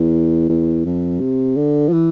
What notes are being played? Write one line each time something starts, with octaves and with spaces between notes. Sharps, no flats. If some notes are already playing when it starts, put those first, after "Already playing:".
Already playing: E2
E2
F2
C3
D3
F3
E3